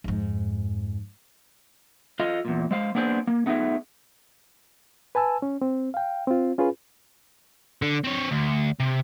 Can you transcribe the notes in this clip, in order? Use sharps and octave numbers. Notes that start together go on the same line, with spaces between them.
F2 G#2
F4 A4 D#5 F5
E2 A#2
G#3 C5 F5
A#3 B3 D4 G#4 C5
A#3
A3 B3 D#4 G#4 E5
B4 G#5 A5 E6
C#4
C4
F5 G5
C4 F4
C#4 F4 G#4 B4
D3
C4 C#5
D2
C3